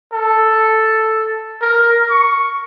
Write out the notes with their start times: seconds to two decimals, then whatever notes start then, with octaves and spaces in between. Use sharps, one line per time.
0.12 A4
1.61 A#4
2.10 C#6